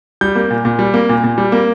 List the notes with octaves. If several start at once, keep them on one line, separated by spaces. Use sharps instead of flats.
G3 G6
A#3
A#2
A#2
G3
A#3
A#2
A#2
G3
A#3